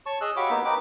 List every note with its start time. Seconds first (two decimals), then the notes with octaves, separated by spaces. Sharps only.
0.06 C#5 A5 C#6
0.21 G#4 D#5 E6 F#6
0.36 F#4 G4 C#5 F5 B5 D6
0.50 A#3 B3 D#4
0.65 C4 D#4 A#4 B4 D6